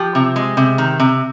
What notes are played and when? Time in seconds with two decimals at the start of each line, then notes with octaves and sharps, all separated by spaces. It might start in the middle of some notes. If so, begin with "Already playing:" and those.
Already playing: F3 G4
0.15 C3
0.36 G#3
0.57 C3
0.78 D#3
1.00 C3